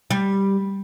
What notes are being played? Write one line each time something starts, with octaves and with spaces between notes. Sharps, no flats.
G3